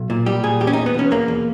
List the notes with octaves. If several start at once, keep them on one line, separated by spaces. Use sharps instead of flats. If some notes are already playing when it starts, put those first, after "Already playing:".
Already playing: B1
A#2
G3 G4
A#2 G#4
E2 G4
C#4
D#4
E2
B3
B2 C#4
E2 A#3
E2